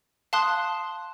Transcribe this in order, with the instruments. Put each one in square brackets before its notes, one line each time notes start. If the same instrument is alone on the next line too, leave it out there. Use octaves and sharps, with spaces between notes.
[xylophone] F5 A5 C6 D#6 F#6